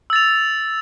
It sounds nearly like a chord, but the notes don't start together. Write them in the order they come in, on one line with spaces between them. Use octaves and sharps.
E6 A6 F7